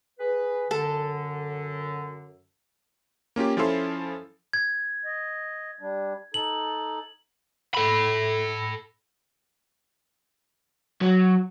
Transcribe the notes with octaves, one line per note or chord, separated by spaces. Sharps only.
G#4 B4
F#2 D3 A4
A#3 C#4 F4 G4
F3 C#4 E4 F4 A4 C6
G#6
D#5
G3 D4
D#4 A4 F#7
A4 B5
F#3